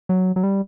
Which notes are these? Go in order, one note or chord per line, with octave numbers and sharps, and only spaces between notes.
F#3
F#3
G3